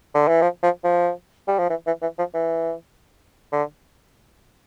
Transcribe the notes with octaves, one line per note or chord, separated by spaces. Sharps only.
D3
E3
F3
F3
F3
G3
F3
E3
E3
E3
F3
E3
D3